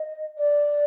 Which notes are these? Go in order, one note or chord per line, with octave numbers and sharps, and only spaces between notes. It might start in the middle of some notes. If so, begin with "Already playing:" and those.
Already playing: D#5
D5